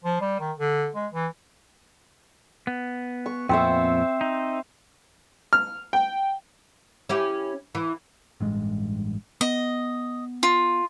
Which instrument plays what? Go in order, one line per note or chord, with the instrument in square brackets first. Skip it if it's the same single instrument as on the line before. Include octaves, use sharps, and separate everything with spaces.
[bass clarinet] F3
G3
D#3
D3
G#3
E3
[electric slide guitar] B3
[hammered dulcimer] C#6
[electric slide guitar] F2 A#2 B3 [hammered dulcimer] C4 C5 E5
[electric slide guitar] D#4
[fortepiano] F6
G5
[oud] C#4 E4 G4
E3
[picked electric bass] A1 G2 G#3
[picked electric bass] B3 [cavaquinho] D#5
[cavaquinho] F4